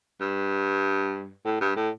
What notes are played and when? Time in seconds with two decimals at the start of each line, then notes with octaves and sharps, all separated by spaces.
0.21 G2
1.45 A2
1.61 G2
1.76 A2